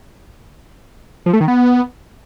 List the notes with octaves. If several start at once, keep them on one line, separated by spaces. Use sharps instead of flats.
F3
A3
D#3
B3